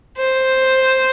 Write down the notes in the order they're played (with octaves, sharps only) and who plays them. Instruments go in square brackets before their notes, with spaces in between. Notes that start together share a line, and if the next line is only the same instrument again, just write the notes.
[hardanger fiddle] C5